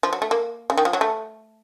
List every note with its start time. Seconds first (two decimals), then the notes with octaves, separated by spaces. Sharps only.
0.03 F3
0.13 F#3
0.22 A3
0.31 A#3
0.70 C#3
0.77 D#3
0.85 F3
0.93 F#3
1.01 A3